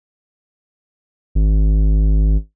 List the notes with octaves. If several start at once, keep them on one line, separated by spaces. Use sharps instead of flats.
G#1